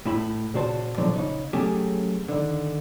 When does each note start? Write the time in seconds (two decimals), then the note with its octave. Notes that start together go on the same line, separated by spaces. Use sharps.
0.05 A2 E4 B5
0.54 C#2 A#2 F#4 C5 A5
0.98 A#2 D3 F3 F#3
1.16 C#3 D#4
1.53 F#3 A3 C#4 G4 G#4
2.28 D3 D#3